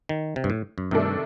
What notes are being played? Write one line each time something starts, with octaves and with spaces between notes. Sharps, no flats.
D#3
C3
G2
A2
F#2
G2 C3 D#3 A3 D4 A4